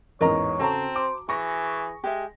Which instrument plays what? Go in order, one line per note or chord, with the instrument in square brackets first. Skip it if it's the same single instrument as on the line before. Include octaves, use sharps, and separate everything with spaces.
[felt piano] A1 E2 G#2 [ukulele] A#4 D#5 A#5 [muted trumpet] C#5
[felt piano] C#3 A4 [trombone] C4 [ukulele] F#4 A5 A#5
[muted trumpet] C5 [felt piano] D6
[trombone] E3 [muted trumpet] G#4 [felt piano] C#6 A#6
[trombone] G#3 [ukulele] G4 E5